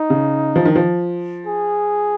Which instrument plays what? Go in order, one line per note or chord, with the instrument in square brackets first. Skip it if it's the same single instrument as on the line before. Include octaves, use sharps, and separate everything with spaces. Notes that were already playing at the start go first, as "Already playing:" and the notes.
Already playing: [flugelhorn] D#4
[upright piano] C#3
F3
D#3
F3
[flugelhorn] G#4